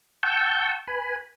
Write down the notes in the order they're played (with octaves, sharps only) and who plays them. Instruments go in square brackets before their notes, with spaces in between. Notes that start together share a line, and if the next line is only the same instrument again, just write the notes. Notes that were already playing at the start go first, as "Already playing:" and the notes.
[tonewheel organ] F#5 G5 A5 C#6 E6 G6
B4 G#5 B5